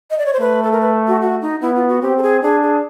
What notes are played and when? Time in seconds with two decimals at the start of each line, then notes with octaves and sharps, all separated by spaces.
0.11 D#5
0.18 D5
0.26 C#5
0.33 C5
0.40 A3 B4
0.63 A4
0.72 A#4
0.81 B4
1.08 F#4
1.21 F#4
1.42 D#4
1.62 B3 E4
1.75 F4
1.88 F#4
2.02 C4 G4
2.18 A4
2.23 G#4
2.42 D4 G#4
2.62 G#4